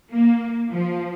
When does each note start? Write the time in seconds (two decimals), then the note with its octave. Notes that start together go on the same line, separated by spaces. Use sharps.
0.11 A#3
0.71 F3